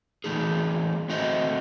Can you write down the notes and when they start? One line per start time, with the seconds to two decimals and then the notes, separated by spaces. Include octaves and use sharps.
0.24 E3 A3 D#4 G#4
1.09 A3 C4 F#4 C5 D#5